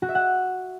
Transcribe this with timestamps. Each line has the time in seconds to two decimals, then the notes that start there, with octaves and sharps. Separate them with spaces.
0.02 F#4
0.09 E5
0.15 F#5